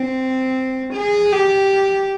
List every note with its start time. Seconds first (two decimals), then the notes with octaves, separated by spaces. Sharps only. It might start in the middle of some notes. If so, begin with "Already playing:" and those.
Already playing: C4
0.94 G#4
1.32 G4